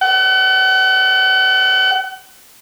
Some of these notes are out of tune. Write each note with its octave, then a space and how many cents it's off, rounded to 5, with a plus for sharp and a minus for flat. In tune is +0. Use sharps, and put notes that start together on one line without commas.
F#5 +40